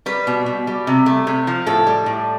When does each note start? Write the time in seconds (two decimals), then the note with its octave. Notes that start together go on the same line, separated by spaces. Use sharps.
0.06 G3 B4
0.27 B2
0.46 B2
0.67 G3
0.87 C3
1.06 A3
1.27 C3
1.47 F3
1.66 A2 A4
1.87 G3
2.06 A2